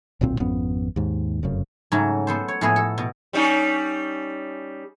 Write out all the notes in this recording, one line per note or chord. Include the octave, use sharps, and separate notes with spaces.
D1 B1 A#2 C4
G#1 F2 B3 C#4
D#2 G#2
F1 F#2 C#3
G#2 C#3 F#3 A3
B3 A4 C5
C#5
A2 F3 G#3 A3 B3 G#4
A4
B2
G3 C#4 D#4